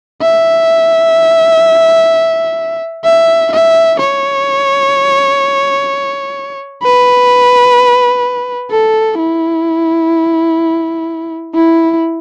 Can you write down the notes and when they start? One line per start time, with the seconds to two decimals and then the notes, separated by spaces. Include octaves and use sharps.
0.22 E5
3.05 E5
3.53 E5
4.00 C#5
6.83 B4
8.71 A4
9.19 E4
11.55 E4